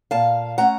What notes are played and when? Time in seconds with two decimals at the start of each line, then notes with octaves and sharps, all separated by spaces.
0.11 A#2 F5 A5
0.58 A3 C#4 F#5 A#5